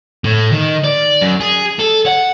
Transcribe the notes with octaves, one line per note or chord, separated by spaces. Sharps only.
A2
D#3
D5
F#2
G#4
A4
F#5